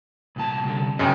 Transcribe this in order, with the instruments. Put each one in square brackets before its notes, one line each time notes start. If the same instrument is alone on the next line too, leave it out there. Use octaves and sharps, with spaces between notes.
[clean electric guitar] C2 A#2 A5
C2 D3
[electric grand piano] G1 F#2 C#3 [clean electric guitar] D#5 G5